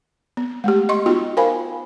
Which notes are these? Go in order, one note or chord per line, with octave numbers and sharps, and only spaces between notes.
B3
G#3 A3 G4
D#5 C6 C#6
B3 D#4 F4 F#4 G5
A#4 C5 F5 G5 G#5 B5